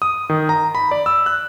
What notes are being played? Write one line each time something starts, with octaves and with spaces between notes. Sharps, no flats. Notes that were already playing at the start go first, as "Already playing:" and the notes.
D#6
D#3
A#5
B5
D5
E6
F#6